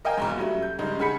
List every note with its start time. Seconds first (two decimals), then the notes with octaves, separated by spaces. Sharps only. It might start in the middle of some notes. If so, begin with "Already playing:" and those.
0.05 A#4 D#5 F5 G5 G#5
0.18 F#1 E2 G#2
0.36 F#3 G3 A3 C#4
0.62 G6
0.79 G2 C#3 G#3 D#4
0.99 C#3 G#4 F#5 B5 B6 C#7